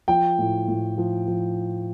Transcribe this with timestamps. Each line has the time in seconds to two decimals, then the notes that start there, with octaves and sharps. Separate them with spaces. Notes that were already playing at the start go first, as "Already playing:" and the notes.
0.08 F3 G5
0.39 A2
0.68 A2
0.98 F3
1.28 F3